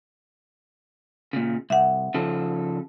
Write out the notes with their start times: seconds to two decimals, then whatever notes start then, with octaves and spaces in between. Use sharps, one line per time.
1.33 A#2 C#3
1.70 C2 E5 F#5
2.14 C#3 F3 A4